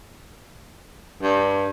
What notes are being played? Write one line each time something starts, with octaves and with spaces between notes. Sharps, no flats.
G2